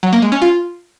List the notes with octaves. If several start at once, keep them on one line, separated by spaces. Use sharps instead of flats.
F#3
A#3
G#3
C#4
F4